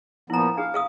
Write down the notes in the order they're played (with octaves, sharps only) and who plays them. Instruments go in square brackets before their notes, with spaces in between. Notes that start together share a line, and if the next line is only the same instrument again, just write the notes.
[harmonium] A#2 F3 B3 [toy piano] E4 A#5
[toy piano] D4 G#4 [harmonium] F5
[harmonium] B2 [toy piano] G#4 F5 D#6